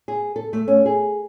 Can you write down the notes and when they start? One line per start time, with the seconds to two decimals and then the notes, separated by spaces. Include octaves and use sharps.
0.08 G#4
0.36 A4
0.53 A3
0.68 C#4
0.86 G#4